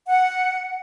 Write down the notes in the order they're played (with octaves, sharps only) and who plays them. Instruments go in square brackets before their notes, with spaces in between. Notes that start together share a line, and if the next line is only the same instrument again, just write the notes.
[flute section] F#5